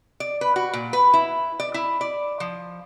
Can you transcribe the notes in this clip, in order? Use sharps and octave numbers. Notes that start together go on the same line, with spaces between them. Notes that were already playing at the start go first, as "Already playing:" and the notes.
D5
B4
F#4
A#2
B4
E4
D5
E4
D5
F3